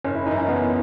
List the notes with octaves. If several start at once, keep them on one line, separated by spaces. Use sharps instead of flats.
F#1 C#4
E4
F#2 E3 D#4
C#4
F#1 B3